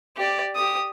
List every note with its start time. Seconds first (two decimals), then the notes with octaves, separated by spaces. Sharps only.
0.17 G4 D5
0.55 G4 D#6